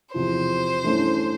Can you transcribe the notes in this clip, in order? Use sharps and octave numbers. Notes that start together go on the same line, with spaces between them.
E2 C3 F3 C5
G2 E3 A3 C#4